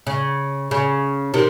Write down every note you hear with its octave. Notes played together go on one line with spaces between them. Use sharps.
C#3
C#3
C3 D#3